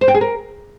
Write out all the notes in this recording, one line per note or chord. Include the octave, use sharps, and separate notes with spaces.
C5
G5
G#4
A#4